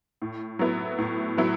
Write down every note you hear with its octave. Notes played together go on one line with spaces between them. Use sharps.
A2
F#3 B3 E4
A2
F#3 B3 E4